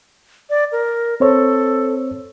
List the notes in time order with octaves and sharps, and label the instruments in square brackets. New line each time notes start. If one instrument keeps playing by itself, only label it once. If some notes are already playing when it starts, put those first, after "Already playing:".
[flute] D5
A#4
[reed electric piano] C4 C5 C#5 [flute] A4